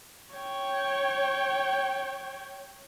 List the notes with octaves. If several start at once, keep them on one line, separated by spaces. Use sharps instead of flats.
C#5 G5